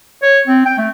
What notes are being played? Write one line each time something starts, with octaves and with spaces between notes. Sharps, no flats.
C#5
C4
G5
A3